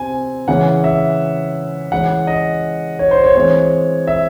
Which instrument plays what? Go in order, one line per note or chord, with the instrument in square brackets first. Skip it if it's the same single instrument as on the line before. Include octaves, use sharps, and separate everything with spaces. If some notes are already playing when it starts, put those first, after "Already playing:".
Already playing: [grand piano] C3 C4 G#5
C#3 E3 G#3 C#4 F#5
E5
E3 G#3 C#4 F#5
D#5
C#5
C5
C#5
E3 G#3 C4 C#5
E5